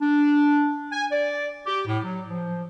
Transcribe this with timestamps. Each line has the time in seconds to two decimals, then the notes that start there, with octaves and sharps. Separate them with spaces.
0.01 D4
0.92 G#5
1.12 D5
1.67 G4
1.87 A2
2.03 F#3
2.28 F3